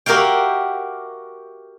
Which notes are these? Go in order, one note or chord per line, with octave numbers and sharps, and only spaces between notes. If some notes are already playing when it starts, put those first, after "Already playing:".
F#4 G4 A#4 E5 F5 G5